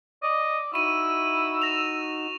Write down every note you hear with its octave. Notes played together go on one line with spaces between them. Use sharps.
D5 D#5
D#4 E4 F#4 C#6 E6 D#7
A#6 E7 F7